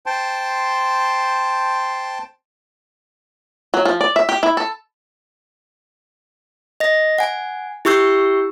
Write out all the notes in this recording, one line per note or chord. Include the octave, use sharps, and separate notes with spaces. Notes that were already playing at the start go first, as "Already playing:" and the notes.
C5 G5 A5 C6
F#3
F3
D5
E5
G4
E4
A4
D#5 A#6
F#5 G#5
E4 G4 C#6 E6 G6 C7